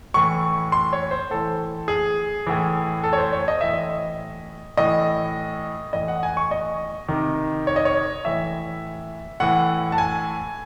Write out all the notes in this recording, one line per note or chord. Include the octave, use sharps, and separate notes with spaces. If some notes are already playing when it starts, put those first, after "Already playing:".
A2 E3 C#6
C6
C#5
C5
A2 E3 A4
G#4
A2 E3
A4
C#5
C5
C#5
D#5
A2 E3 E5
D#5
A2 E3 D#5
A2 E3 D#5
F#5
G#5
C#6
D#5
C3 D#3
C#5
D#5
C#5
A2 E3 E5
A2 E3 F#5
A5
G#5